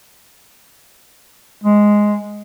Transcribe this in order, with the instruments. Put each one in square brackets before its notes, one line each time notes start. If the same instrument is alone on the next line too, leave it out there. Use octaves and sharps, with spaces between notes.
[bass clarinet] G#3